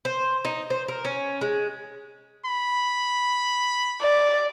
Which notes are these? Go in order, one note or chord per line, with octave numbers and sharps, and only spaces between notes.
C5
D#4
C5
A#4
C#4
G#3
B5
D5